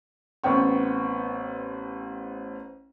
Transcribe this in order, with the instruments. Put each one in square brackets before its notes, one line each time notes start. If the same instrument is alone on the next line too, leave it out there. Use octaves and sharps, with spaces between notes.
[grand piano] A1 B3 C4 G5 C#6